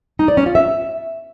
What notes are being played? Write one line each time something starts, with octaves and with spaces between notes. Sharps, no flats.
D#4
D5
C#4
F4
E5